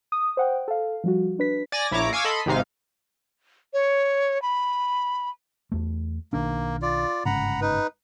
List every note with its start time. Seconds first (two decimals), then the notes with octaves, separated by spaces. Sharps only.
0.12 D#6
0.37 C5 F#5 G5
0.68 A4 F5
1.04 F3 G3 F#4
1.39 D4 B4 B6
1.72 D5 G#5 A6 A#6
1.91 A#1 E4 C#5 A#5 D6
2.13 F5 G#5 C#6 D6 E6 G#6
2.25 A4 D#5 B5 C6
2.46 G#1 G#2 C3 D#4 F5
3.73 C#5
4.42 B5
5.72 E2 A3
6.33 B1 D#3 A#3 D4
6.82 F4 D5
7.26 G1 G#2 C#3 F#5 A#5 B5
7.61 D#4 B4